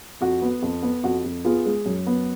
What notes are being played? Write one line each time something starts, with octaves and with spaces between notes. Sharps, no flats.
F2 F#4
B3
F2
B3
F2 F#4
F2
B3 F4 G#4
G#3
F#2
B3